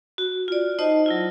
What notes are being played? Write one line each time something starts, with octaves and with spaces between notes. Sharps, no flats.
F#4
F4 D5
D#4 C5 D#5 A5
F#3 E4 F4